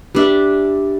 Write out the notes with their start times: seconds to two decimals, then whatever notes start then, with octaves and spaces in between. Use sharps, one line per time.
0.15 G3 D4 E5